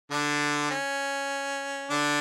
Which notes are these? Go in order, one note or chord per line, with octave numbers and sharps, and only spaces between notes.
D3 D4
C#4
D3 D4